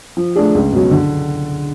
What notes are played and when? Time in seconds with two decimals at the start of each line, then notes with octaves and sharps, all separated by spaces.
0.17 F3
0.36 A3 D4 G#4
0.55 C#2
0.72 B2 F#3 C#4
0.91 D3